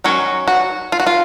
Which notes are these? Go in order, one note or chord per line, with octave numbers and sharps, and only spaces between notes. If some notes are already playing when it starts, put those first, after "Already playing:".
D#3 F#3 C#4 F#4
F#4
F4
F#4
F4